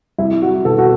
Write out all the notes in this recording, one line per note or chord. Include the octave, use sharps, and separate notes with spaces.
C2 E4
F#4
B2 A4
F#4